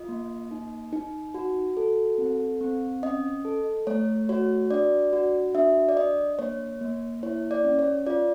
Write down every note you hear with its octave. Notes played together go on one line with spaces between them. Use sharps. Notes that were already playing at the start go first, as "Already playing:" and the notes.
Already playing: F4 D#5
A#3
D#4
D#4
F#4
A4
C4
C4
C#4 D#5
A4
A3 C#5
F#4 C#5
D4 D5
F#4
D4 E5
D5
D4 D#5
A#3 C#5
A#3
E4 C#5
D5
C#4
C#5
F4 D5